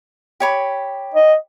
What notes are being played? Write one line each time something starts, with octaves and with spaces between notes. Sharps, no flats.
G4 C#5 B5
D#5